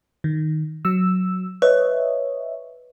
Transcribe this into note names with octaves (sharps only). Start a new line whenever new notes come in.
D#3
F#3 E6
B4 C#5 D#5 E5